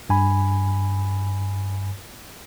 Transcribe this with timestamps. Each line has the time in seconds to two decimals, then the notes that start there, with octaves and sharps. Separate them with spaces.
0.10 G2 G#5 B5